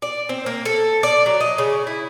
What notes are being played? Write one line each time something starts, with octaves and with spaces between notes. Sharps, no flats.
D5
C4
A#3
A4
D5
F#3
D#5
C#3
E4